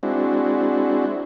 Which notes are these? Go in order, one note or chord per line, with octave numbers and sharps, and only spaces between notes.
G#3 C4 D4 E4 F#4